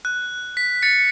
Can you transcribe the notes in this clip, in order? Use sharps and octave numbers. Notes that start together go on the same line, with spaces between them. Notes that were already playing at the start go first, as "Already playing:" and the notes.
F#6
B6
A6 C#7